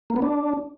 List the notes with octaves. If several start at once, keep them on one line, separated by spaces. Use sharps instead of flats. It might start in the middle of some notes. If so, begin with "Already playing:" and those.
A#3
B3
D4